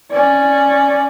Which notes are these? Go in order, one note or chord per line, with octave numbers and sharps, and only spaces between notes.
C#4 D5